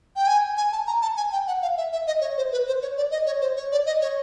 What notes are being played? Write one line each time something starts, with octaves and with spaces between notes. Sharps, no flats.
G5
G#5
G#5
A5
A#5
A5
G#5
G5
F#5
F5
E5
E5
D#5
C#5
C5
B4
C5
C#5
D5
D#5
C#5
C5
C#5
D5
D#5
C#5